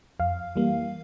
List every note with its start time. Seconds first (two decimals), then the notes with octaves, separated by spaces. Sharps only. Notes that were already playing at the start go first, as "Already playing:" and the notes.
0.19 F2 F5
0.56 E3 G3 A#3